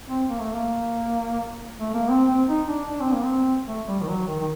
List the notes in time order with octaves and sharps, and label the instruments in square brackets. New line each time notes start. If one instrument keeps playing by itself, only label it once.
[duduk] C4
A#3
A3
A#3
A3
A#3
C4
C4
D#4
D4
D4
C4
A#3
C4
A3
G3
D#3
F#3
D#3
D#3